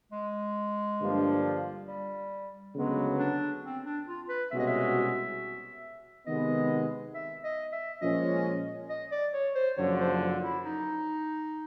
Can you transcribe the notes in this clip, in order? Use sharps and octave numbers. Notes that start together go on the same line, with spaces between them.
G#3
G2 D3 F3 A#3 D4
G3
D2 C#3 F#3 G#3 B3
D4
C4
D4
F4
B4
C2 B2 G#3 C#4 F#4 E5
D#5
E5
C3 D#3 G#3 B3 D#5
E5
D#5
E5
A#2 F3 G#3 C#4 D#5
D#5
D5
C#5
C5
F#1 F#2 D3 F3 C#5
C5
E4
D#4